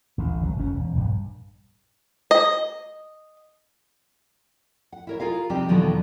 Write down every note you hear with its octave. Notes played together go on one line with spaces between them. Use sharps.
A1 D2 D3
C#2 F#3
F#1 F2 C#4
E1
A#1 G2
D#5
F#5
E4 A#4 C#5
F4 G#4 A#4 F5
C3 F3 G3 C4 D#4 G4
E2 B2 D3 D#3 F3 F#3